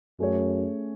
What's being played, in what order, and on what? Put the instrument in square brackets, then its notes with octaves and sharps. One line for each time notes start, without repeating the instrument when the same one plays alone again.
[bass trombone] F#2 [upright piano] A3 C#4 G#4 C#5